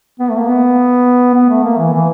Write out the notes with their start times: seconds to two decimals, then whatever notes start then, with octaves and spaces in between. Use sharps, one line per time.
0.20 B3
0.30 A3
0.39 A#3
0.48 B3
1.34 B3
1.49 A3
1.64 A#3
1.78 E3
1.93 E3